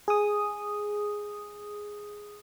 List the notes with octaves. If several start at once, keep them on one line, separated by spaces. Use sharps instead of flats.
G#4 D#6